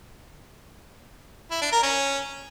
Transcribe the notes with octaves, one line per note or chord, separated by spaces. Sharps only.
E4
D4
A#4
C#4